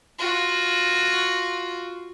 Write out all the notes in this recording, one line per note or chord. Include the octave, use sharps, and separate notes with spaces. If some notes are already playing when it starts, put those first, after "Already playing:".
F4 F#4